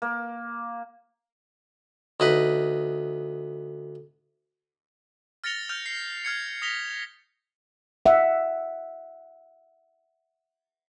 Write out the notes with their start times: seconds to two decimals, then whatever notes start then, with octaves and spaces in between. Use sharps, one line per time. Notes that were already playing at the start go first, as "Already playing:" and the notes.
0.02 A#3
2.20 D2 D#4 B4
5.44 F6 A6 A#6 C#7 F7 G7
5.69 F6 G6 F7
5.86 C7
6.25 F6 G#6 C#7
6.62 D#6 A#6 B6 F7 G7
8.06 E5 F#5